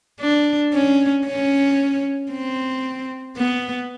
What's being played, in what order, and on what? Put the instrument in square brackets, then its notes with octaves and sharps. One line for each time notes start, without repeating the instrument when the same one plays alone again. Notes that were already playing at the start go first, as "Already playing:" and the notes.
[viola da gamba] D4
C#4
C#4
C4
B3